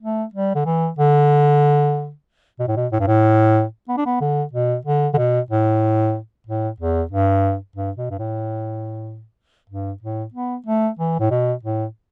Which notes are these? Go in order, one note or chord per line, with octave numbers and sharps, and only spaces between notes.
A3
G3
D3
E3
D3
B2
A2
B2
A2
G2
A2
B3
D4
B3
D3
B2
D3
D3
B2
A2
A2
E2
G2
G2
B2
G2
A2
G2
A2
B3
A3
E3
A2
B2
A2